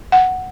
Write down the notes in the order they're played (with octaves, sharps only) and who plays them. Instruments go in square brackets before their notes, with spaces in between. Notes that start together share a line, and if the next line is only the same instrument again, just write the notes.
[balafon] F#5